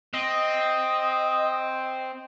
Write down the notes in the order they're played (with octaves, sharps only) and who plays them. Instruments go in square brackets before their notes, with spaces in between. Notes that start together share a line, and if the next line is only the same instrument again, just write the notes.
[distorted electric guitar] C4 [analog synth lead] D#5